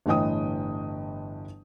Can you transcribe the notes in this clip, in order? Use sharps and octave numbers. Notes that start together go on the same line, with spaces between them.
G1 A2 E3 D#5 G5 D#6